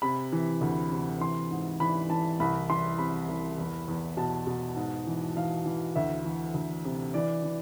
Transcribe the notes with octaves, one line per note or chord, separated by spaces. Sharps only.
C3 B5
E3
D2
C3
E3 C6
G#2
E3 B5
E3 A5
C2 B5
E3 C6
C3 B5
C2
E2
E2
B2 A5
B2
G#2
E3
E3 F5
E3
D2 E5
E3
D2
C3
E3 D5
E3